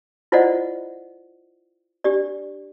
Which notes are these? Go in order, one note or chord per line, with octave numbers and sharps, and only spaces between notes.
E4 F4 C5 D5 D#5 F#5
D4 G4 D5